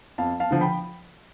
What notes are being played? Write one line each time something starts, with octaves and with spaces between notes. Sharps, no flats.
F2 F5 A5
F5 A5
D3 F3
G5 B5